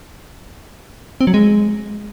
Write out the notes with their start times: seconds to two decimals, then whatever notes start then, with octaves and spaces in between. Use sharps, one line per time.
1.21 C4
1.27 F#3
1.34 G#3